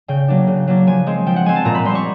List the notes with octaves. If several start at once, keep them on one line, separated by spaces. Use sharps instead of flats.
C#3 G5
F#3 A#3 D4
C#3
F#3 A#3 D4
F3 G#5
G#3 C4
F3 G5
F#5
G#3 C4 G#5
A5
A#2 A#5
B5
G3 C4 C6
C#6